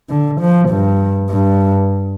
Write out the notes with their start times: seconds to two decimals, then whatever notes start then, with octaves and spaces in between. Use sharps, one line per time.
0.10 D3
0.41 F3
0.69 G2
1.30 G2